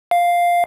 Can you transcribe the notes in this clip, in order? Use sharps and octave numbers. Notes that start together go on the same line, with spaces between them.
F5